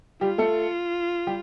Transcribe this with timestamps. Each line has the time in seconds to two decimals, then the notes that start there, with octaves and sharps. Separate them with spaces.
0.21 G3 F4 G4
0.38 A3 A4
1.27 G3 G4